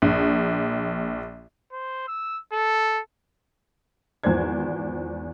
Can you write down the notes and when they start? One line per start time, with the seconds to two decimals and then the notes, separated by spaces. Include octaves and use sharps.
0.02 A#1
1.72 C5
2.08 E6
2.53 A4
4.24 G#1 E2 F3 C5 D5 G#6